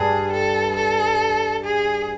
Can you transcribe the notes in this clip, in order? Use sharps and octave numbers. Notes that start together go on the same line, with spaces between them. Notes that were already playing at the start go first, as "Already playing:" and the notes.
Already playing: G2 G#4
A4
A4
G#4